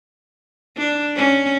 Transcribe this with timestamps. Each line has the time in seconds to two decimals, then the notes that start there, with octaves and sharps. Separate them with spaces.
0.78 D4
1.16 C#4